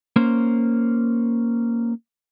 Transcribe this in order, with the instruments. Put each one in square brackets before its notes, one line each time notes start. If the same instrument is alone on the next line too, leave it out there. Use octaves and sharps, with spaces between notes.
[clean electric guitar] A#3 C#4 C5